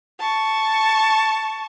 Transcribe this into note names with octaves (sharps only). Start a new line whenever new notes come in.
A5 C#6